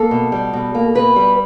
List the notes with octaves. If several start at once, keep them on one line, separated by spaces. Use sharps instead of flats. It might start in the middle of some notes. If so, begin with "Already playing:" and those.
Already playing: A#3 A4
B2
G3
B2
A#3
B2 B4
G3